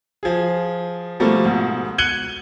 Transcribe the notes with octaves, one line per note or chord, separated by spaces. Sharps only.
F3 G#4
B2 F3 G3 A3 A#3
G#2 B2
F#6 G#6 C#7 D#7 F#7 G7